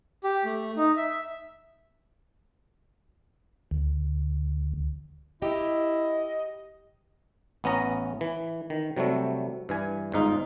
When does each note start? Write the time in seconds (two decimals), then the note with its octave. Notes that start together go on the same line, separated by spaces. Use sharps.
0.24 G4
0.45 A3
0.77 D#4
0.97 E5
3.71 D2
5.42 E4 G4 D#5
7.64 A1 B3 C#4 A#5
8.21 E3
8.70 D#3
8.97 C3 F#3 G3 A3
9.69 G2 E3 G#5
10.12 G1 G#2 D#4 F4